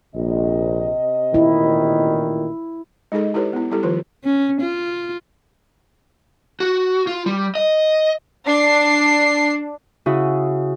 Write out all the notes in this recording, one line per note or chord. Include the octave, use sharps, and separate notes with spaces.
A#1 C3 D#5
A1 A#2 D#3 E4
G#3 D#4 G#4 A4 D#5
E4 G4 A4 B4 C#5
B3 E4
G3 E4 G4 A4
D#3 F3 F4 B4
C#4
F4
F#4
F4
G3
D#5
D4 C7
C#3 E4 F#4 E5 D#6